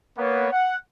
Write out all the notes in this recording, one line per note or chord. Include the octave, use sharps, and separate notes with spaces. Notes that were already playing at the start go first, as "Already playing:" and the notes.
A#3 B3 C#5
F#5